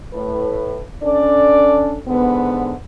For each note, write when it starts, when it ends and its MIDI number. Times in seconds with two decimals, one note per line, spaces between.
0.13 0.81 45
0.13 0.81 71
1.03 1.96 61
1.03 1.96 62
1.03 1.96 69
1.03 1.96 74
2.07 2.72 44
2.07 2.72 50
2.07 2.72 59